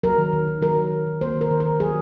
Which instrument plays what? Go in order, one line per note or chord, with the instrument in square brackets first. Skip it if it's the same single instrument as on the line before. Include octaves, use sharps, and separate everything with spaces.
[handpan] F#3 A#4
D#3
D#3
D#3
F#3 A#4
D#3
D#3
D#3
A#3 C5
D#3
A#4
D#3
A#4
D#3
F#3 G#4